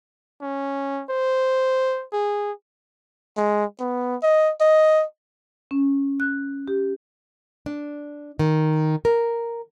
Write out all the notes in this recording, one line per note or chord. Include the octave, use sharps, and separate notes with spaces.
C#4
C5
G#4
G#3
B3
D#5
D#5
C#4
F#6
G4
D4
D#3
A#4